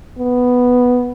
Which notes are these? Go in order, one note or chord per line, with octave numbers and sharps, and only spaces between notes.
B3